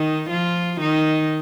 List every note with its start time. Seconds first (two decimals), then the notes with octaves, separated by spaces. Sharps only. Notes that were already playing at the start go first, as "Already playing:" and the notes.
Already playing: D#3 D#4
0.30 F3 F4
0.81 D#3 D#4